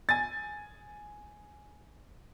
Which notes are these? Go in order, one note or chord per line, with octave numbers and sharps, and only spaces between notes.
G#5 A6